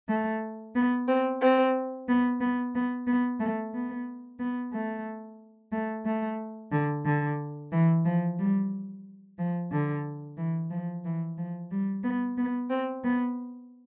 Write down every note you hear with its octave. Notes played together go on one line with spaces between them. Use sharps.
A3
B3
C4
C4
B3
B3
B3
B3
A3
B3
B3
A3
A3
A3
D3
D3
E3
F3
G3
F3
D3
E3
F3
E3
F3
G3
B3
B3
C4
B3